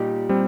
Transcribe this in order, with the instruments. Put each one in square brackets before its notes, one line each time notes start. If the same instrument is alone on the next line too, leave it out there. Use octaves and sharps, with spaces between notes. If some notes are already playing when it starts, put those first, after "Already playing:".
Already playing: [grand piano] A#2 G3 D#4 G4
[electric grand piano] G3 C4